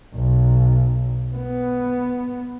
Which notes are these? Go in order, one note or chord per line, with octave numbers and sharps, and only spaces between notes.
B1
B3